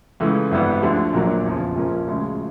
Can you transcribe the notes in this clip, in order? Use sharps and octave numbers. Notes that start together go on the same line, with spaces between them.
C#2 C#3 E3 A3
G#1 G2 E3 G3 B3
D2 D3 F3
A#1 A#2 F#3 A#3 D4
E2 C#3 F3
A#1 A#2 F3 A#3 C#4
D2 C#3 F3 G#3